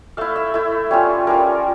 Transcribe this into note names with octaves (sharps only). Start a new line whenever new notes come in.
A3 E4 F5
E5
A3 E4
G3 C#4 F4 C#5
G3 C#4 F4 A#4